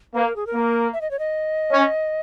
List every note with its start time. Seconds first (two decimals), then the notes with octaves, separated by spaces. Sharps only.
0.15 A#3 B4
0.25 A#4
0.36 G#4
0.47 A#4
0.54 A#3
0.93 E5
1.01 D#5
1.11 C#5
1.19 D#5
1.71 C#4